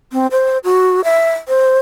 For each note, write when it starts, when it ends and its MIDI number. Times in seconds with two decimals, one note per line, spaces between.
0.12 0.27 60
0.31 0.58 72
0.64 1.01 66
1.04 1.31 76
1.48 1.79 72